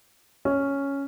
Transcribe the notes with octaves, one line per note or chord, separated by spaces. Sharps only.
C#4